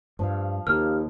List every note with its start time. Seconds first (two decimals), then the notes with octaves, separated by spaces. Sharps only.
0.19 G2 F3 F5
0.67 D#2 D#4 G4 A#4 F6